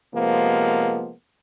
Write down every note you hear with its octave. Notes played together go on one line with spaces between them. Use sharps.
C3 F3 G#3 A#3 B3